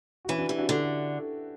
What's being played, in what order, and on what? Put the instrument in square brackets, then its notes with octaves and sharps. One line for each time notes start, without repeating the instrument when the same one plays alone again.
[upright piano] F#4
[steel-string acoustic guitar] E3 [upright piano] C#4 E4
[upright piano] D4 F#4
[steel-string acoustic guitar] E3 [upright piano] E4 G4
[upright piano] D4 F#4
[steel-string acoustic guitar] D3 [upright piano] D4 F#4